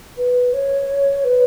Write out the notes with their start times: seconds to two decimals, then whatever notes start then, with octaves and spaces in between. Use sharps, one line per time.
0.17 B4
0.53 C#5
1.24 B4